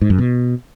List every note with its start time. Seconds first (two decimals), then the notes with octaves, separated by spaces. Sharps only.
0.01 G#2
0.10 F#2
0.18 B2